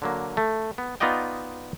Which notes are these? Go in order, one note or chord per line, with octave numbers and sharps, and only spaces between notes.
D3 F#3 A#3
A3
B3
B3 D#4 F4 D5 D#5 G5